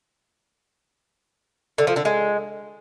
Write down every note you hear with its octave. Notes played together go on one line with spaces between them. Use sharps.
D3
F3
D3
G#3